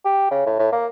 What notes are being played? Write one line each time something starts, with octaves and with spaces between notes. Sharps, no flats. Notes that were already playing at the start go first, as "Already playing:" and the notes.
G4
C#3
A2
A2
A#3